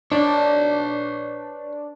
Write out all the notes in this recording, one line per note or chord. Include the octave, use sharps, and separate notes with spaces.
D4 B4 C#5